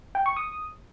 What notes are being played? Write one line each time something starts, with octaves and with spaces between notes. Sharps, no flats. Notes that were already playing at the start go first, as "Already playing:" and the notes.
G5
C#6
D#6